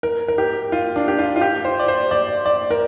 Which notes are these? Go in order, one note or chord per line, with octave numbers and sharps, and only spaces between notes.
A#4
A#4
G4
F4
D4
G4
F4
F4
G4
C5
D5
C5
D5
D5
A#4